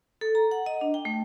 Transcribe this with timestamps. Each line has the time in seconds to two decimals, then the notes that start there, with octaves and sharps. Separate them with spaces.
0.21 A4
0.35 A#5
0.51 F#5
0.66 D#5
0.81 D4
0.94 G5
1.05 A3